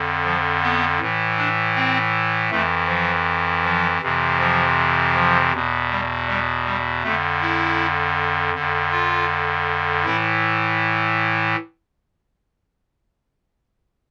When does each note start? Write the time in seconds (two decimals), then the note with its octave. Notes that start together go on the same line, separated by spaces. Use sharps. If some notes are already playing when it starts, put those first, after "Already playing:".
Already playing: F2 D3
0.24 F3
0.62 B3
1.00 A2 E3
1.37 D4
1.76 C4
2.51 F2 E3 A3
2.88 F3
3.64 F3
4.02 F2 C3 E3
4.40 F3
5.15 F3
5.52 E2 B2
5.90 G3
6.28 G3
6.65 G3
7.03 F2 D3 A3
7.41 E4
8.54 F2 D3
8.92 F4
10.05 A2 E3 E4